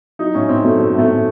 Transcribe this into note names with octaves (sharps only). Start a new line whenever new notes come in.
F#3 D#4
A2 C#4
A2 C4
F#3 A3
F#3 A3
A2 A3
A2